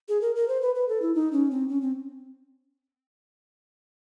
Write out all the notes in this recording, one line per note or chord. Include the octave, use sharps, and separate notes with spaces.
G#4
A#4
A#4
C5
B4
B4
A4
E4
D#4
C#4
C4
C#4
C4